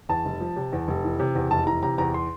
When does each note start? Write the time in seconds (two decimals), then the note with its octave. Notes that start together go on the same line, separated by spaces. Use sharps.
0.09 E2 A5
0.25 F1
0.41 F3
0.56 C3
0.72 E2
0.88 F1
1.04 E3
1.20 C3
1.35 E2
1.51 F1 A5
1.67 E3 A#5
1.83 C3 A#5
1.98 E2 A#5
2.14 C6